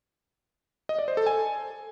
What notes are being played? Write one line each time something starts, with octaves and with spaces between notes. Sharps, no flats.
D#5
D5
C5
A4
G#5